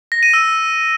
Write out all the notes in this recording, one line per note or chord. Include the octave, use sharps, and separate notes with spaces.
A#6
D#7
E6